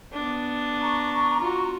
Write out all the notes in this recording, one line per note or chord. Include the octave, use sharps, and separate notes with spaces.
B3 D4
A#5 C#6
F4 F#4